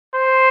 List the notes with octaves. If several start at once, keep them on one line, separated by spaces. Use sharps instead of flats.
C5